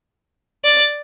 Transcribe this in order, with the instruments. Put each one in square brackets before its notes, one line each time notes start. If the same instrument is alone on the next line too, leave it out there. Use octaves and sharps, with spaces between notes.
[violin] D5